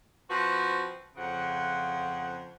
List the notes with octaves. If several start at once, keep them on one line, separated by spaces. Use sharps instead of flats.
F3 C4 F#4 B4
F2 C#3 F3 F#5